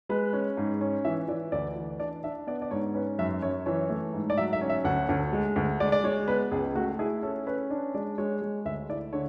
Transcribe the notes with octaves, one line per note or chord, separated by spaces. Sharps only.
G#3 B4
C#4
G#2
C#4
E3 E5
E3 D5
D2 D5
E3
D4 D5
D4 E5
B3 D5
D5
G#2 C#5
C#4 B4
F#2 E5
F#2 C#5
E3 C#5
A3
G#2
D5
F#3 E5
E5
C#4
E5
D2 F#5
D2
G#3
D2
G#3 D5
D5
G#3 C#5
B3 B4
C#2 G#4
A3 F#4
E4 G#4
C#4 A4
C#4 B4
D4
G#3 D5
G#3 C#5
G#3
D2 E5
E4 D5
D3 C#5